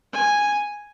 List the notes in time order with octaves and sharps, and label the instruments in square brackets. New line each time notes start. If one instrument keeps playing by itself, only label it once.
[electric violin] G#5